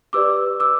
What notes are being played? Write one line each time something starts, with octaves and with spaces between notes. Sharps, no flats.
G4 B4 D5 D6 E6
D6 E6